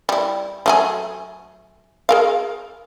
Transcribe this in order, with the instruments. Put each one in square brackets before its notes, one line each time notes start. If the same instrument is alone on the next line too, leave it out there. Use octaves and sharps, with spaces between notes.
[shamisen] G3 E4
F#3 A3 G#4
G#4 A#4 F5